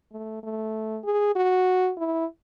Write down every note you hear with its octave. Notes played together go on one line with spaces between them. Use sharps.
A3
A3
G#4
F#4
E4